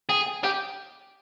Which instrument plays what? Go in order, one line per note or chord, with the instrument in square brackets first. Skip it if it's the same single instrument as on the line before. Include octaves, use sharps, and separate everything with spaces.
[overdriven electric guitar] G#4 [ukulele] G5
[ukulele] G5
[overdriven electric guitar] G4 [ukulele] G5